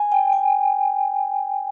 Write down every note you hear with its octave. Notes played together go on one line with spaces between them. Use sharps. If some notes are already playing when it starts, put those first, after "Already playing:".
Already playing: G#5
G5
G#5